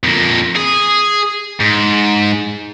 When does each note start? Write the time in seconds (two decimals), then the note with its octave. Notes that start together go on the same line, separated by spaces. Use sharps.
0.04 F2 A#3
0.56 G#4
1.60 G#2